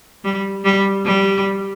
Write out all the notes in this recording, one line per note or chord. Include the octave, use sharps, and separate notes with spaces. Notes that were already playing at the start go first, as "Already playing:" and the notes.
G3
G3
G3